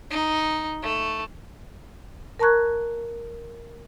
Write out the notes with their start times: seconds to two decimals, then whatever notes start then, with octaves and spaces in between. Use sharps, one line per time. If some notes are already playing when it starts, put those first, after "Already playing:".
0.11 D#4
0.82 A3
2.39 A#4 A5 A#5 C#6 F#6 G#6